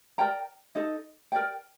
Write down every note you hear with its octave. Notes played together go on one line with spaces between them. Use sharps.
A#4 D5 G5 A#5
D#4 A4 D#5
A#4 D5 G5